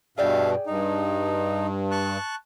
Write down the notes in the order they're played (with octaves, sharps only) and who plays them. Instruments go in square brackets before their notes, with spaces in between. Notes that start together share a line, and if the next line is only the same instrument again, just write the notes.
[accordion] G2 B2 [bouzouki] G#4 D5 G5 [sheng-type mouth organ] E5 F5
[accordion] G2 [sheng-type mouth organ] D#4
[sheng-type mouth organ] A5 C#6 F#6